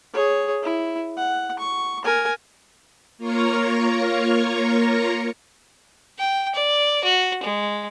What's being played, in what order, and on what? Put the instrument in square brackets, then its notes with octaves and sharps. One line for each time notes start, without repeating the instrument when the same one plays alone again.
[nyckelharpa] G#4 C#5
E4
F#5
C#6
A#4 G#5
[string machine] A#3 F4 A#4 C#5 A#5 C#6
[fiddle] G5
D5
F#4
G#3